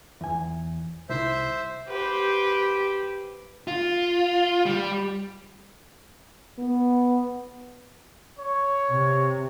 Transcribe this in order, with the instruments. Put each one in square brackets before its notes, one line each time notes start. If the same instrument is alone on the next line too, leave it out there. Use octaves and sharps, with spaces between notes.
[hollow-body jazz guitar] E2 G#5
[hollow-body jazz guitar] C2 E4 C6 [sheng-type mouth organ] C5 E5
[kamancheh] G4 C5 [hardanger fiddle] B4
[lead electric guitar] F4
G3
[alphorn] B3
[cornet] C#5
[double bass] C3